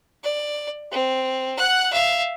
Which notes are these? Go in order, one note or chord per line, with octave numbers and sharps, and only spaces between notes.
D5
C4
F#5 F#6
E5 F5